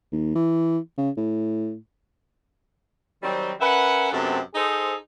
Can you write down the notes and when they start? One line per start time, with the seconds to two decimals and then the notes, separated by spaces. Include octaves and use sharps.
0.12 D#2
0.35 E3
0.98 C#3
1.17 A2
3.22 D#3 F#3 G3 C4
3.60 C#4 A#4 B4 E5 F#5
4.11 F#2 C3 A3 B3 C4 D4
4.55 D#4 G#4 A4 C5